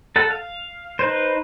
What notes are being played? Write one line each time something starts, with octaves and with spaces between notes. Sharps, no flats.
A4 F#5 A5
F5
D#4 B4 C5